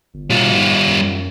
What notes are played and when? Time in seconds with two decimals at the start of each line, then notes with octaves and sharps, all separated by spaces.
0.14 G1
0.30 B2 G3 F4
0.52 G#2
0.88 F#2